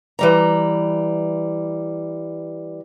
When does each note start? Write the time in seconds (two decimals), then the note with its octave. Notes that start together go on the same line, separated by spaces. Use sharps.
0.19 E3 G3 A#5